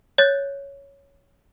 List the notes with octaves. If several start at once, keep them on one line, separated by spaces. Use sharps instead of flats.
C#5 F#6 G6 A6